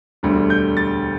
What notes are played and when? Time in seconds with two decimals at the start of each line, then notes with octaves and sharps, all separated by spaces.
0.23 E1 D2 D3 G3
0.50 G6
0.77 A6